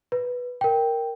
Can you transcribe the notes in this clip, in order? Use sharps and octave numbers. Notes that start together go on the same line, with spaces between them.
B4
A#4 G5